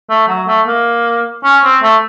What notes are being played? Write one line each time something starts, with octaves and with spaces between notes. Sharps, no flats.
A3
F#3
A3
A#3
C#4
C4
A3